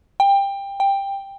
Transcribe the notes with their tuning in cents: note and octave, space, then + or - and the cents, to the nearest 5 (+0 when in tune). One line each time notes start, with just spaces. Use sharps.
G5 +20
G5 +10